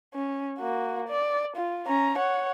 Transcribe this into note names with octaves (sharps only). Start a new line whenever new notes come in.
C#4
A#3 F#4
D5
F4
C#4 A#5
C#5 F#5